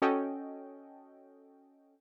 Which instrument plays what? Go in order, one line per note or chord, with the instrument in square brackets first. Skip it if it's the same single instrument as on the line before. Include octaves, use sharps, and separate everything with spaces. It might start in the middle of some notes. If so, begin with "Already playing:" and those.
[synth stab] C#4 F#4 A4 D#5 G5